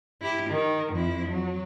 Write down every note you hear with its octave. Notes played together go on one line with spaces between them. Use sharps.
E4 G4
D#3
F2 E4
F#3